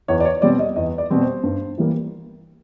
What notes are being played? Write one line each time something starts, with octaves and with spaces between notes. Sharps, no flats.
E2 C#5
D5
C#5
B2 G3 C4 D5
D#5
E2 D#5
D5
B2 G3 C4
C5
G2
E3 G3 A#3